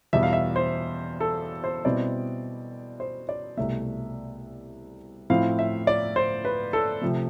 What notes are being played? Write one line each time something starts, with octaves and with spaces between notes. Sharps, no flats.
E2 B2 G3 E5
F5
E5
C5
A4
C5
B2 G3 C4 E4 D5
C5
D5
C2 B2 A3 E5
A2 F3 C4 E4 F5
E5
D5
C5
B4
A4
C3 F3 A3